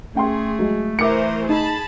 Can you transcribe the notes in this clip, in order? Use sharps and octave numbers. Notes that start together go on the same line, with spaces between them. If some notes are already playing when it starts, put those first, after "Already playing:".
A3 C#4 G#4 G5 C6
F#3 G#3
E3 A#4 C5 E5 D6 C#7
D#4 G#4 A5 B5